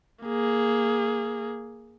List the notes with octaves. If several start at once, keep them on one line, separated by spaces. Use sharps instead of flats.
A#3 G#4